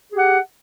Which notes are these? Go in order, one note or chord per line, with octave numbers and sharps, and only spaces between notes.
G4 G#4 F#5